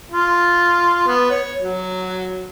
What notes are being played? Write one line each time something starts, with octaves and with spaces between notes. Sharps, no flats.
F4
B3
C#5
F#3